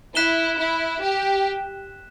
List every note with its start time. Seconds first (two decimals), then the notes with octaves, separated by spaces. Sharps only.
0.15 E4 F#6 B6 E7 G7
0.58 E4
1.01 G4